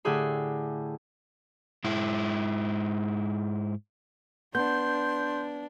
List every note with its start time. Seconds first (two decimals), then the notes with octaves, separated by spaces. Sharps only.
0.05 A2 D3 E4 G4 G#4 B5
1.84 G#2 G#3 E4
4.55 B3 D4 C6 G6